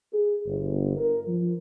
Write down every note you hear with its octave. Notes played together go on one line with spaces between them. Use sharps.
G#4
G1
A#4
F3